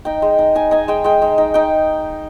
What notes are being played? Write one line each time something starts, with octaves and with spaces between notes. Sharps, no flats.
D#4 G5
G#3
D#4
D#4 G#5
D#4 G#5
G#3 G5
G#3 G5
G#3
D#4 G5
D#4 G5